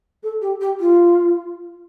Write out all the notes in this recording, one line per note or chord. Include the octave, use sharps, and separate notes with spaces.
A4
G4
G4
F4